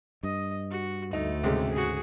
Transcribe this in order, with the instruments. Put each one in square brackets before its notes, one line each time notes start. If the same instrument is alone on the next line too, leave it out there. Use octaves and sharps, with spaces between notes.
[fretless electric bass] G2 [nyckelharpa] D#5
[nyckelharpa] F#4
[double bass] D2 [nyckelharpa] A3 [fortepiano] D#4
[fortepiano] C2 G#3 G4 [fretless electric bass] G#2 C#3
[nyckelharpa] F#4 G#4